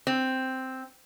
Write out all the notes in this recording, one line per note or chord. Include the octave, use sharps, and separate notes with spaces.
C4